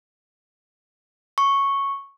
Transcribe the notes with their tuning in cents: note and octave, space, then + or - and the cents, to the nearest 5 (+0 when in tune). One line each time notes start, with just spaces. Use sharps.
C#6 -5